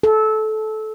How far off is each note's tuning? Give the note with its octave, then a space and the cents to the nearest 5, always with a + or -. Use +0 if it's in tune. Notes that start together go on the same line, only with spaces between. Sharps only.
A4 -20